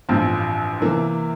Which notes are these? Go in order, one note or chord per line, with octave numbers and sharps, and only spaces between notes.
A1 G2 F3 C4
C3 E3 A#3